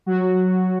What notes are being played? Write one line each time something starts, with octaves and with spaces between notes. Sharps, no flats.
F#3 F#4